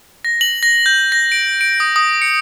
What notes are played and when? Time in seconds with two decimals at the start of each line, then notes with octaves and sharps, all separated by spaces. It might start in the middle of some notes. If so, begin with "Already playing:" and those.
0.25 A#6
0.41 F#7
0.63 A#6
0.86 G6
1.12 A#6
1.32 D7
1.61 D7
1.80 D#6
1.96 D#6
2.22 C#7